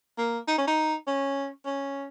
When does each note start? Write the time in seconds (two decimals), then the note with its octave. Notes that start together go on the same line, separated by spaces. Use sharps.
0.18 A#3
0.47 D#4
0.58 C#4
0.67 D#4
1.07 C#4
1.66 C#4